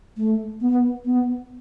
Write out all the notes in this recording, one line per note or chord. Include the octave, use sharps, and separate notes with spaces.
A3
B3
B3